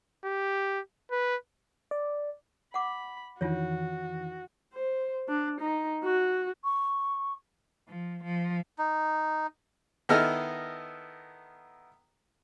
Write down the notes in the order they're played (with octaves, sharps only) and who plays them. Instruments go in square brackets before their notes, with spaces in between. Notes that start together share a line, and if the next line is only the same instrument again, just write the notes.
[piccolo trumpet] G4
B4
[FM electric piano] D5
[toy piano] F#5 D6 [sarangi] B5
[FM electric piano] F2 D#3 E3 [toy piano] D4 F4 C#5 [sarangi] F#4
[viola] C5
D4
D#4
F#4
[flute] C#6
[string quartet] F3
F3
[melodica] D#4
[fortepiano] D#3 B3 E4 A4 D#5 F6